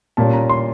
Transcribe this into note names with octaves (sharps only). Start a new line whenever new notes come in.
A#2 G3 A#3 C#4 A5
A#5
C6